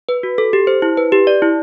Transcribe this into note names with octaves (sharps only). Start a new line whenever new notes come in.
B4
F#4
A4
G4
C5
E4
B4
G4
D5
E4